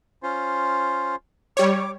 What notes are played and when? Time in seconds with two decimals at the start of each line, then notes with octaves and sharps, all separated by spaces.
0.23 C#4 F4 C5
1.57 G3 C#5 D6